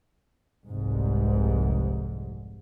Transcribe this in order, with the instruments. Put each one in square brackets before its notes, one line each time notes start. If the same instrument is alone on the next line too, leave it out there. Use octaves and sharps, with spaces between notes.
[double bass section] F1 C2 G#2